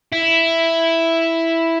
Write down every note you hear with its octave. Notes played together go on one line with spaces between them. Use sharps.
E4